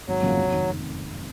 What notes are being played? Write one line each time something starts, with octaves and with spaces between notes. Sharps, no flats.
G#1 F#3
F#2 C#3 F3 A#3
F1
D#3